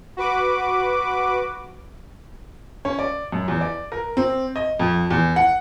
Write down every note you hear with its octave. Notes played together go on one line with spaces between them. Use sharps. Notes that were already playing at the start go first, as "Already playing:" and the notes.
F#4 B4 D6
C#4
D5
F#2
E2
D5
A#4
C4
D#5
F2
E2
F#5